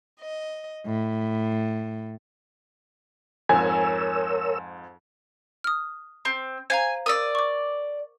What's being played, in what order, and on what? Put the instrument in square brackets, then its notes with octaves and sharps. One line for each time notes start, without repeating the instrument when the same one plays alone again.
[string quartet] D#5
A2
[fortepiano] F2 G#2 [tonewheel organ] A#4 C#5 E6 [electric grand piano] G#5
[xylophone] D#6 F6
[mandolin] C4
[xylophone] C5 F5 A#5 [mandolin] G#5
[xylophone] A#4 E6 [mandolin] D5 D#6
[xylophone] C#6 D6